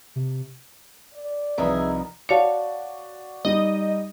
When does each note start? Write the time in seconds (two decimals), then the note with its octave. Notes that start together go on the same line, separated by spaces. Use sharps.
0.16 C3
1.13 D5
1.58 C2 D#3 F3 D#4 G#4 B4 E5
2.29 F#4 C#5 D5 F5 A5
3.45 G3 D#4 D#5